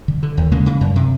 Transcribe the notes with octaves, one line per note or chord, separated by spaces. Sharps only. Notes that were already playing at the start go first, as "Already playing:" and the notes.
D3
D3
D#2
C#3 G#3 A#3
C#3
F#2
C3